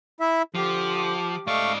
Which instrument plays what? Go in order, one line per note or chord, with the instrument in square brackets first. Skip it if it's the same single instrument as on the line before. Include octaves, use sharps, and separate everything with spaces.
[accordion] E4 E5
[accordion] D3 [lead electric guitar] F3 [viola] G4 D6
[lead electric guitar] G#2 D5 [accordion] A3 F5 C#6 [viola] D#5